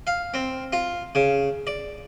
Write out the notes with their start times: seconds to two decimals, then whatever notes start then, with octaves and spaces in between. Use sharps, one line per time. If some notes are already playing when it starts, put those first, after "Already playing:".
0.07 F5
0.34 C4
0.73 F4
1.15 C#3
1.67 D5